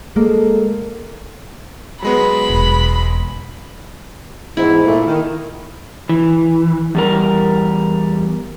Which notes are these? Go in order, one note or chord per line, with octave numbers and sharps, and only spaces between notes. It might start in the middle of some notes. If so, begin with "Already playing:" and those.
G#3 A#3 A4
F#3 G#3 B3 B5
E1
E2 G#2 E4
A#2 A3
D#3
E3
E2 G3 A#4